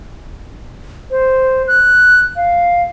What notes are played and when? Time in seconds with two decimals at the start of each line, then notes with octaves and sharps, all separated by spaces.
1.11 C5
1.68 F#6
2.36 F5